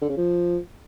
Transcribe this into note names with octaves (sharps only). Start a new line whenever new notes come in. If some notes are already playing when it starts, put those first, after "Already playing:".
D3
C#3
F3